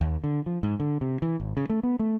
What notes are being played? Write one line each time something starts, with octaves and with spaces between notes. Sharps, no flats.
D#2
D3
F3
G#2
D3
C3
E3
G#1
C#3
A3
B3
A3